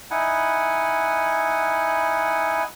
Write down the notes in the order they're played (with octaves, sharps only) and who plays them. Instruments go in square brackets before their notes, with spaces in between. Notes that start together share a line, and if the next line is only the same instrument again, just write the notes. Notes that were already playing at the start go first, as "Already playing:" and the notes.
[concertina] D#4 E4 F#5 G#5